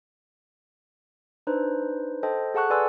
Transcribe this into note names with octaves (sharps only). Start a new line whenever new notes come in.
D4 D#4 B4 C5
A4 C5 D#5 G5 A5
G#4 A4 F#5 A5 C#6 F#6
G#4 B4 D5 G#5 C6 E6